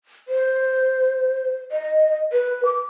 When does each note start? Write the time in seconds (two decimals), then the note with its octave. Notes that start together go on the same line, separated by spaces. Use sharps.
0.28 C5
1.72 D#5
2.33 B4
2.65 D6